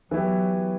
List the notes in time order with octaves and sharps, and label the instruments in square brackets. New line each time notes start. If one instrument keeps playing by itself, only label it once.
[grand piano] E3 B3 E4 G4 [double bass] F#3